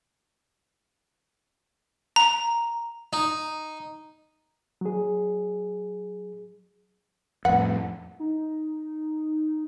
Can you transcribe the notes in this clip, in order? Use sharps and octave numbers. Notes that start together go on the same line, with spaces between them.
A#5
D#4
F#3 G#4
F2 A2 B4 F#5
D#4